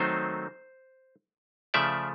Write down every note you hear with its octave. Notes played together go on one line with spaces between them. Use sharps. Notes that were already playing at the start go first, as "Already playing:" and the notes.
Already playing: D#3 F#3 A3 C4 D#4 C5
C#3 F3 A3 D5 E5